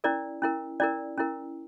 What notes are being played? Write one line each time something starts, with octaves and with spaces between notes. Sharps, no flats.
C#4 E4 A#4 D5
C#4 E4 A#4
C#4 E4 A#4 D5
C#4 E4 A#4